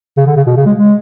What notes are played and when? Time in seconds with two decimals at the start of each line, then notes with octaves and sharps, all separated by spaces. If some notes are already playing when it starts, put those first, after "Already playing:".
0.17 C#3
0.27 D3
0.37 C#3
0.47 B2
0.57 C#3
0.66 G#3
0.76 G#3